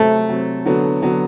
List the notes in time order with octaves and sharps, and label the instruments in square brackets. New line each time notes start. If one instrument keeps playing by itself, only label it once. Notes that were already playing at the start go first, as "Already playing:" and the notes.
Already playing: [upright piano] C3 F#3 C4 [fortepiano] A3
[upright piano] C3 F#3 C4
D3 F#3 B3
D3 F#3 B3